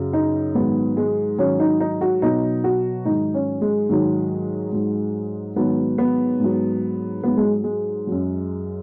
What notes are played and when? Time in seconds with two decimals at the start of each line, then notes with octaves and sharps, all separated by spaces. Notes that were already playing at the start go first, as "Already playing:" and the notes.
Already playing: F#2 C#3 F#3
0.13 D#4
0.55 G#2 D#3 F#3 B3
0.97 G#3
1.38 G#2 D#3 F#3 C#4
1.60 D#4
1.80 D#4
2.01 F#4
2.22 B2 F#3 D#4
2.64 F#4
3.05 G#2 D#3 F#3 D#4
3.34 C#4
3.61 G#3
3.89 G#2 D#3 F#3
4.73 G#2 F#3
5.56 G#2 D#3 F#3 B3
5.98 B3
6.40 G#2 F#3
7.23 G#2 F#3 B3
7.37 G#3
7.64 G#3
8.07 F#2 F#3